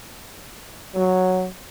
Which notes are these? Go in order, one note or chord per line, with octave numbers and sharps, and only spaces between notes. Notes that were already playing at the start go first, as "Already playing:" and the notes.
F#3